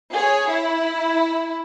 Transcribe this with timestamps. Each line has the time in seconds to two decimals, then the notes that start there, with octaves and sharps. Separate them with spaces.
0.13 G#4 C#5
0.48 E4